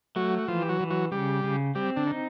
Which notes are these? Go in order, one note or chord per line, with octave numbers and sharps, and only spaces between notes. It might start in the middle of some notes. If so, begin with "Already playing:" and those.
F#3 A3 F#4
F#4
E3 F3 F4
G4
F#3 F#4
E3
F#3 F#4
C#3 G3 G4
C#3
G3 C4 G4
D3 D4
D#4